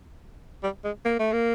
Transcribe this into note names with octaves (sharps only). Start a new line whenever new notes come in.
G3
G#3
A#3
A3
A#3